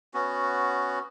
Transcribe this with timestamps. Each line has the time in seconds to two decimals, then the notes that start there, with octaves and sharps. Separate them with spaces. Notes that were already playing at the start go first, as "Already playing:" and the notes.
0.14 B3 C#4 F#4